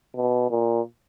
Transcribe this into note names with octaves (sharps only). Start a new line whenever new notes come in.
B2
A#2